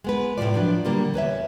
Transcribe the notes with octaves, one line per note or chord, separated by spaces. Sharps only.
G#3 B3 B4
A2 C3 D#3 F3 F4 D5
F3 F#3 D4 B4
A#2 D3 G3 A#3 G4
E2 B4 C#5 E5